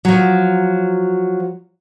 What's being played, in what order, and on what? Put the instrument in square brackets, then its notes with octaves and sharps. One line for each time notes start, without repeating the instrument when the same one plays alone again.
[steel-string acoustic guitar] F3 F#3